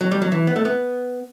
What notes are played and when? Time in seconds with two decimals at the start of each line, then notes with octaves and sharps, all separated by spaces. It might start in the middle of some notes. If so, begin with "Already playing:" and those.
0.01 F#3
0.11 G3
0.22 F#3
0.32 E3
0.47 B3
0.56 A3
0.65 B3